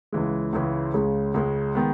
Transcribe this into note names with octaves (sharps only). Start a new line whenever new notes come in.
C#2 C#3 E3 G#3
C#2 C#3 E3 G#3
C#2 C#3 G#3
C#2 C#3 G#3
D#3 G#3 B3